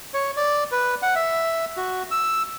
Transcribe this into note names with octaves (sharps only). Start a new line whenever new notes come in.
C#5
D5
B4
F#5
E5
F#4
E6